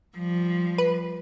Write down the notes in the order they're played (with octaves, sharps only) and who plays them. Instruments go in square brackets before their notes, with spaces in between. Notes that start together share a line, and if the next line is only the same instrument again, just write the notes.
[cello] F3 G3
[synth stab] B4